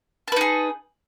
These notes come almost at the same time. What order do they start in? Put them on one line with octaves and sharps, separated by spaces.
A5 B4 D#4 G#4